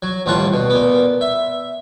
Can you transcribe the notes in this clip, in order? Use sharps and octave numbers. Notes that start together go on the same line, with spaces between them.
F#3
A1 D#2 G3 F4 F#5 A5
B2
A#2 B3
E5